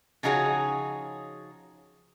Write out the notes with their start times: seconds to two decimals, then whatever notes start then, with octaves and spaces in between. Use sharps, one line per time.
0.23 C#3 F3 D#4 F#4 G#4 C#5